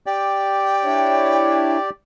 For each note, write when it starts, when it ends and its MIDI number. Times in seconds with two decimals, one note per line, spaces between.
0.06 1.90 67
0.06 1.90 74
0.06 1.87 79
0.84 1.77 62
0.84 1.77 64
0.84 1.77 73